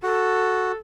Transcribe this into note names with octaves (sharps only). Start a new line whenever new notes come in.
F#4 A4